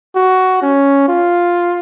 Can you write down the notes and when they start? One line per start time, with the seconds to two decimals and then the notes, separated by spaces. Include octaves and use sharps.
0.16 F#4
0.62 C#4
1.08 F4